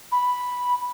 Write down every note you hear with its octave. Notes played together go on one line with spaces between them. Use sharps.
B5